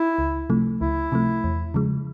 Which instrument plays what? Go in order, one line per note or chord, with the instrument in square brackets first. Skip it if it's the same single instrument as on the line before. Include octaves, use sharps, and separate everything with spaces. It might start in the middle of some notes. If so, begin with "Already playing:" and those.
Already playing: [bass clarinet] E4
[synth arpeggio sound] C#2
C3 F3 A3
[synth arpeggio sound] C#2 [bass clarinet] E4
[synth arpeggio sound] C3 F3 A3
E2
C#3 F3 G#3